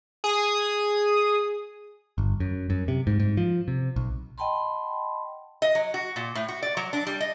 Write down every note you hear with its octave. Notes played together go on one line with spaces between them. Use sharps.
G#4 D#6
G1
F#2
F#2
C3
G#2
G#2
F3
C3
B1
D#5 F#5 G5 A5 B5 C6
D#5
F#3
F#4
A#2
A2
F#4
D5
F#3
D4
G3
D#5